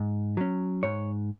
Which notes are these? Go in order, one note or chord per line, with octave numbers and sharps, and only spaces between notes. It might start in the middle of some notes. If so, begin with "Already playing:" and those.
Already playing: G#2
F#3 C#4
G#2 C#5